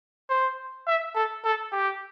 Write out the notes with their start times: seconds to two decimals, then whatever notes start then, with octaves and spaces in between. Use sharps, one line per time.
0.30 C5
0.87 E5
1.15 A4
1.44 A4
1.72 G4